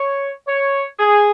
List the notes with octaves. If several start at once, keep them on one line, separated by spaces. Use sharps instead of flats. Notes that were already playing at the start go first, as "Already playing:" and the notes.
Already playing: C#5
C#5
G#4